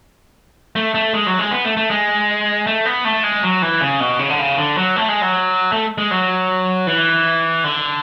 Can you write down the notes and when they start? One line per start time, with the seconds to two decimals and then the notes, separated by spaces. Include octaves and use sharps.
0.76 A3
0.94 A3
1.14 G#3
1.26 F#3
1.39 G#3
1.51 B3
1.64 A3
1.77 A3
1.91 G#3
2.67 A3
2.85 B3
3.05 A3
3.23 G#3
3.43 F#3
3.62 E3
3.81 C#3
4.00 B2
4.19 C#3
4.30 D3
4.39 C#3
4.58 D3
4.77 F#3
4.96 A3
5.09 G#3
5.22 F#3
5.72 A3
5.98 G#3
6.11 F#3
6.87 E3
7.64 D3